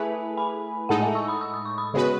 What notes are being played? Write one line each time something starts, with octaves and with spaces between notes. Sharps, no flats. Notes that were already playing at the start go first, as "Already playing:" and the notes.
Already playing: A3 E4 G#4 B4 E5 G#5
G#5 B5
A2 G#3 D#4 A4 F#5 A5
E5 G#5
C#6 E6
B5 D#6
E6
D#6
C#6
B5 D#6
C#3 G#3 B3 F#4 B4